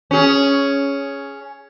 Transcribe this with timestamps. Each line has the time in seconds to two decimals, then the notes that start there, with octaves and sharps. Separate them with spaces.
0.11 C#4 G#4